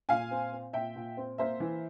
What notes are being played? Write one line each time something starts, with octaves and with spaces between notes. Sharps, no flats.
A#2 F5 G#5
C4
C4
A#2 E5 G5
A#2
C4
A#3 C5 E5
E3